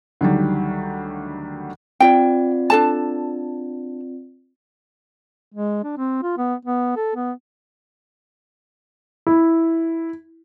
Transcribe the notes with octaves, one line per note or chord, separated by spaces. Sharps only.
D2 D#3 F#3 G3
C4 F4 D5 G5
D4 A4 A5
G#3
D4
C4
F4
B3
B3
A4
B3
E4